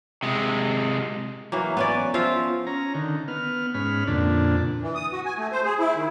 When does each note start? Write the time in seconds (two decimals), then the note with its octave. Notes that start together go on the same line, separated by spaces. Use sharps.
0.23 C3 G#3
1.52 E3 F#3 A#3
1.77 B3 C#4 D5
2.14 F3 F4 E5 F5
2.67 C#4 A#5
2.95 D3 D#3
3.28 B3 F6
3.74 G#2 C#4 B5 F6
4.07 F2 A#2 D3 D4
4.82 E3
4.95 D#6
5.12 F#4
5.26 G#5
5.38 A3
5.52 C5
5.65 G#4
5.79 E4
5.96 D#3